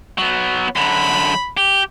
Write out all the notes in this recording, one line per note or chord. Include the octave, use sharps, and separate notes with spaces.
F#3 B3
F#2 D3 B5
G4